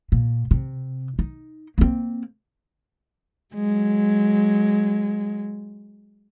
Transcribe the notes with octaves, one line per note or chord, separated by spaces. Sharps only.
A#2
C3
D#4
A#3 C4
F#3 G#3